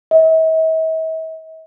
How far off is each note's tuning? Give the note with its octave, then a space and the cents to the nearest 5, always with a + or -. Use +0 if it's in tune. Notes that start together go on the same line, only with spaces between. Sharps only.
E5 -45